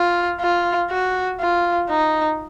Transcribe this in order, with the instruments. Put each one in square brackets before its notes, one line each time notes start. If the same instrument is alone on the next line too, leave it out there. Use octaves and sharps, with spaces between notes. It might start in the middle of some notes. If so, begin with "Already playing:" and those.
Already playing: [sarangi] F4
F4
F#4
F4
D#4